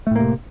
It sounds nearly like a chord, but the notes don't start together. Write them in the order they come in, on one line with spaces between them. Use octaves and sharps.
A3 A2 A#3 C3